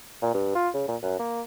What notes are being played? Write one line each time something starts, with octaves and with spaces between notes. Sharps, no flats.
A#2
G2
F4
C#3
A#2
F#2
A#3